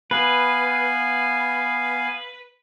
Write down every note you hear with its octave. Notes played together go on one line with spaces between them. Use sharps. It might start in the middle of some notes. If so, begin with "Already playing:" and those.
B3 B4 F5 G#5